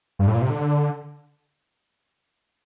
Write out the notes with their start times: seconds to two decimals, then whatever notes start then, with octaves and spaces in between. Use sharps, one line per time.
0.19 G2
0.27 A2
0.35 A#2
0.42 C3
0.50 D3